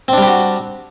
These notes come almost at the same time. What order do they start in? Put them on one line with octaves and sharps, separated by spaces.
C4 D4 G3 G4 F#4